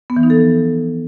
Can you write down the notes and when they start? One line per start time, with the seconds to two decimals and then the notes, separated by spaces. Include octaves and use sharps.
0.10 B3
0.16 E3
0.23 D#4
0.30 A4
0.37 F3